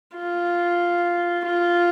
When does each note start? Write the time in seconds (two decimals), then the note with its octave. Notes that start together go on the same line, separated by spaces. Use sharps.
0.16 F4
1.45 F4